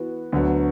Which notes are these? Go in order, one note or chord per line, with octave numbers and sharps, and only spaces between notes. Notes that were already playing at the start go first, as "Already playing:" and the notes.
Already playing: E3 B3 F#4
D2 D3 F#3 B3